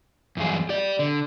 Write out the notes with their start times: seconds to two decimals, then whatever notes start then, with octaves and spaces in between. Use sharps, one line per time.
0.37 E2 G2 F#3 G#4
0.69 G4 D5
0.99 D3